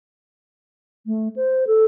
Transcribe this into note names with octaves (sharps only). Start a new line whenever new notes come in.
A3
C5
A4